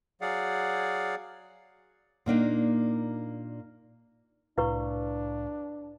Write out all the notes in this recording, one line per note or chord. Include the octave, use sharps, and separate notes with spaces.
F#3 G#4 D5 F5 F#5
A#2 A#3 D4 D#4
C2 A2 D4 E4 B4 F5 C#6